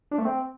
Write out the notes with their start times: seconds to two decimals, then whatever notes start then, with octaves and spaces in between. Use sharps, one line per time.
0.11 D4
0.18 A3
0.25 C4